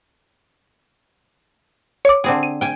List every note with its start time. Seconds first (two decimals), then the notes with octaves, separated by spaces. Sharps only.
2.05 C#5 D6
2.24 D3 C4 G#4
2.43 D#7
2.61 G5 G#5